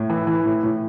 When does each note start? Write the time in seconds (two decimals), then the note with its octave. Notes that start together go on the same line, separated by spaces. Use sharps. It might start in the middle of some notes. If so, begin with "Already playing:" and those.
Already playing: A2
0.10 E3
0.27 E3
0.46 A2
0.63 A2